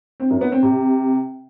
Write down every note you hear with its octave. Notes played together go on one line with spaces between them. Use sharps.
C4
F#2
B3
C4
C3